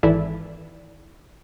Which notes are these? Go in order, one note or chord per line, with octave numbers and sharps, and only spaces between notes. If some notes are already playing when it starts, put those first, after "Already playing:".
G#1 E3 E4 A4 D5